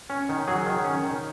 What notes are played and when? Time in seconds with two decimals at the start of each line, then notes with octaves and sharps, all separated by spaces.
0.10 C#4
0.29 D#3
0.47 F#3 G#4
0.66 D#3
0.84 C#4
1.03 D#3